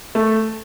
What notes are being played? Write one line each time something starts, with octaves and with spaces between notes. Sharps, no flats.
A3